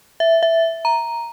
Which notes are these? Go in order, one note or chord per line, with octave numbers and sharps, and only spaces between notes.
E5
E5
A#5